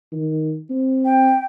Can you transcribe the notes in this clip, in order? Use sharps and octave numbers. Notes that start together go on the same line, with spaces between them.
D#3
C4
G5